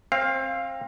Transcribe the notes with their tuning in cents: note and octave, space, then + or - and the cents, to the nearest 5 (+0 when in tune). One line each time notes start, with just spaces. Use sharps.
C4 +30 F5 +0